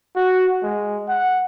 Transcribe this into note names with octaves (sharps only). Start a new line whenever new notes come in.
F#4
G#3
F#5